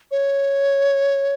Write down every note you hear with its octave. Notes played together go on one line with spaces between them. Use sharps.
C#5